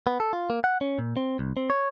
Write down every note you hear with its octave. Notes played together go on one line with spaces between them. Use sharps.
B3
A4
F4
A#3
F#5
C#4
A#2
C4
C2
C4
C#5